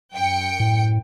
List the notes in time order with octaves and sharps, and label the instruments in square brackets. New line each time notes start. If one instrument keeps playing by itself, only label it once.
[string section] F#2 G5 C#7
[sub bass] A2